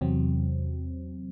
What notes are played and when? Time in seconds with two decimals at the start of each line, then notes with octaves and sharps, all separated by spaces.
0.01 E2 C3 F#3 C4